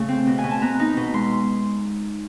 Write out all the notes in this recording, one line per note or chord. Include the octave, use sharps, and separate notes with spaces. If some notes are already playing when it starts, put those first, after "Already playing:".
Already playing: C#3 A3
C4
B2
G#5
B2
A5
B3 A#5
D#4
B2
G#3 C6